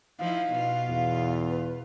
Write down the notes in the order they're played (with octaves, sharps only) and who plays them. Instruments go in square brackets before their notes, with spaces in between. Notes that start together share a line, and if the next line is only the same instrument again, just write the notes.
[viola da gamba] F3 D#4 E4 [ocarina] F5
[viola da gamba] B2 F4
[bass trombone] E2
[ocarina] B4